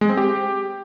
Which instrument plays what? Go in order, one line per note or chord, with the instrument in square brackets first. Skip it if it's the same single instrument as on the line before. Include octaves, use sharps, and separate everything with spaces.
[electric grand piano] G#3
C4
G4